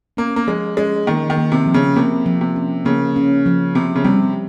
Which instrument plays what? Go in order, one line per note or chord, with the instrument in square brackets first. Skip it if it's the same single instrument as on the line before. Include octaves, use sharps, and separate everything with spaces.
[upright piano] A#3 [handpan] C#4
[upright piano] A#3
[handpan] F3 [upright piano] G#3
[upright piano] G#3 [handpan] C#4
[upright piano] D#3 [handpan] A#3
[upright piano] D#3
[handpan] A#3
[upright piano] C3
[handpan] F3
[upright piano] C#3
[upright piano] C3 [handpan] A#3
[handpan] F3
[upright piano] C3
[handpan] C#4
[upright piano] C#3 [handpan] A#3
[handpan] C#4
F3
[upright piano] C3 [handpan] C4
[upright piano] C#3
[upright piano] C3 [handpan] G3